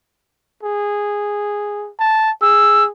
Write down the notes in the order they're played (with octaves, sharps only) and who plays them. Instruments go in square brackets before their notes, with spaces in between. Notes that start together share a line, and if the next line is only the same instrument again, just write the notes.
[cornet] G#4
A5
[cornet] G#4 [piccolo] E6